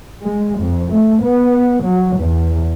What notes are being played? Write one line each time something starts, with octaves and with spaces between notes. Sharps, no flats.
G#3
F2
A3
B3
F#3
E2